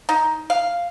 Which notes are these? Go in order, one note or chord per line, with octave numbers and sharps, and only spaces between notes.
D#4
F5